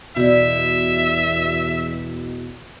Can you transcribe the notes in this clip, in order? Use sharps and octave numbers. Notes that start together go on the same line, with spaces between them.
E2 B2 G3 E4 E5